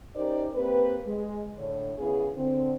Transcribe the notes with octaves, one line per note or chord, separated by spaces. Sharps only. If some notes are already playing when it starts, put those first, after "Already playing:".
C#4 D#4 G4 A#4 C5 D5
A#3 C4 G4 B4
G#3
A2 D3 C#5
C#3 B3 E4 G#4
D3 C4